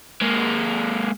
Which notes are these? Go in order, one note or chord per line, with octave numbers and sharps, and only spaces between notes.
G#3 A#3